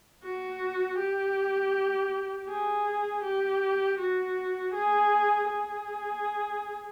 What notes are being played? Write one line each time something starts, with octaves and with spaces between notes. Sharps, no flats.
F#4
G4
G#4
G4
F#4
G#4
G#4